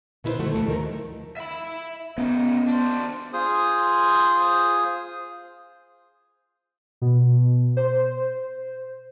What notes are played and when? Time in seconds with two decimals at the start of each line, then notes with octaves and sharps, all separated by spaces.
0.24 A#2 D#3 E4 A4 B4 C5
0.39 D3 F3 A3 F#4 A4
0.52 D2 G#2 E3 A3
0.68 D#3 F3 A#4
1.37 E5 B5
2.18 C#3 B3 D#4
2.68 D4 C5
3.33 F4 G#4 C5 D#6
7.01 B2
7.77 C5